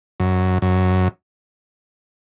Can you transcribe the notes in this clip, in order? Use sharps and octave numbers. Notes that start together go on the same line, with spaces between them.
F#2
F#2